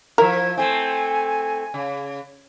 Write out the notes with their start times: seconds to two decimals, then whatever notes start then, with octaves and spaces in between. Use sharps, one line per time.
0.18 F3 E4 A#4
0.58 A3 C4 G#5
1.74 C#3